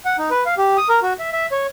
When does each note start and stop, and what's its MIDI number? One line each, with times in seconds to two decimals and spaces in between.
0.05 0.17 78
0.18 0.30 63
0.31 0.43 71
0.46 0.54 77
0.58 0.77 67
0.77 0.88 87
0.89 0.99 70
1.02 1.13 66
1.19 1.30 76
1.32 1.46 76
1.52 1.67 73